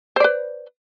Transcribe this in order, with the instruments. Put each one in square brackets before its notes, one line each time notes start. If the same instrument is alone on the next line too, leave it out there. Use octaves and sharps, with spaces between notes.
[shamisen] C5
D5
B4